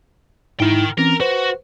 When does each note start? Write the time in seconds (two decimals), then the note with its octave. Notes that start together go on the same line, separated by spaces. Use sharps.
0.60 G#2 D#4 E4 A#4 G5
0.98 E3 C4 C#4 A#4
1.20 F#4 B4 C5